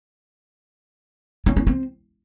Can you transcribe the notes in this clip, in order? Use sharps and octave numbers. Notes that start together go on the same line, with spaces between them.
C#4
C#4
C4